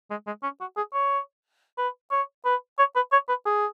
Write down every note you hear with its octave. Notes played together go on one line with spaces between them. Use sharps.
G#3
G#3
C#4
F#4
G#4
C#5
B4
C#5
B4
C#5
B4
C#5
B4
G#4